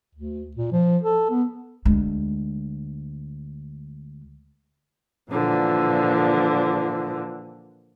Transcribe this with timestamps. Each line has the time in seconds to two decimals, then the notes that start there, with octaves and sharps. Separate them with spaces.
0.15 D2
0.56 A#2
0.72 F3
1.03 A4
1.31 B3
1.85 D2 G#3
5.31 A#2 D3 E3 F3